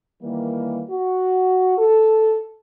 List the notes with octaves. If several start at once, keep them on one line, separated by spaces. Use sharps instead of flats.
D#3 E3 G3 A#3
F#4
A4